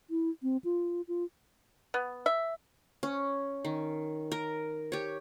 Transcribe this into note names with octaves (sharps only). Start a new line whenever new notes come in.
E4
C4
F4
F4
B3
E5
C#4
D#3
A#4
G4 C#5